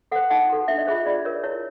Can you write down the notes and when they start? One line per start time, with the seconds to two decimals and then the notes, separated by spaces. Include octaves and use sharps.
0.11 A4 C5 F#5
0.30 D#4 F#5
0.49 F#4 A4
0.68 D4 E5
0.78 D#5
0.87 F4 G#4 C5 E5
1.06 F4 D5
1.25 A#4 C#5
1.43 E4 C#5